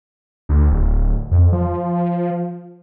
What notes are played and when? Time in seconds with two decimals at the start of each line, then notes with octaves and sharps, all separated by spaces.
0.49 D2
0.71 D1
1.31 F2
1.53 F3